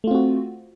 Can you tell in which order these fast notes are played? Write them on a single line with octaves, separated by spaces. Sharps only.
A3 F4 C4 F#4